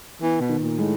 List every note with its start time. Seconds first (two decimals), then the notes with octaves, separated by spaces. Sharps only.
0.21 E3 B3
0.40 B2
0.49 D#3
0.59 A#2
0.78 A2 G#3